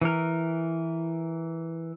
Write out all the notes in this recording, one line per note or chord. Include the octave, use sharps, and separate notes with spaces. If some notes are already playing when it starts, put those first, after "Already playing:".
E3 A#4